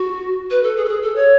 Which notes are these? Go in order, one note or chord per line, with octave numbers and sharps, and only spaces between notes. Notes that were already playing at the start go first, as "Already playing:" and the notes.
Already playing: F#4
B4
A4
G#4
A4
G#4
A4
C#5